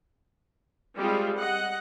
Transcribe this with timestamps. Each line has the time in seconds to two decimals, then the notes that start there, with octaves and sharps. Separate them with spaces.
0.96 G3 G#3 C4 F4
1.38 D#5 F#5